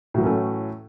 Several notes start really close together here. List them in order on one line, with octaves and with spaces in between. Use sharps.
A2 F#3 E3 C#4 A3